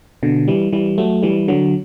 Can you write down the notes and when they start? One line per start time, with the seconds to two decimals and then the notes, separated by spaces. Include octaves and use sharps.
0.23 B2 D3
0.48 E3 G3
0.72 E3 G3
0.98 F#3 A3
1.23 E3 G3
1.48 D3 F#3